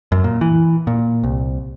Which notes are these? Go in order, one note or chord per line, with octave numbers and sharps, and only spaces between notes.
F#2
A#2
E3
A#2
C2